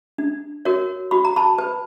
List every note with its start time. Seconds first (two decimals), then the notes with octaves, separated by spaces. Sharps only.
0.18 D4
0.65 F#4 A#4 C#5
1.11 F#4 B5
1.25 A#5
1.36 A5 B5
1.58 B4